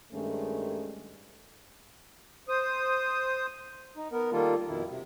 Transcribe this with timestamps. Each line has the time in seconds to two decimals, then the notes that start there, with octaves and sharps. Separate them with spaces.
0.13 G2 D#3 G#3 A3 C#4
2.48 C5 D#6
3.97 D#4
4.12 B3 A#4
4.32 D#3 G3 A#3 F4 A4
4.68 F2 B2 D#3 E4
4.88 C3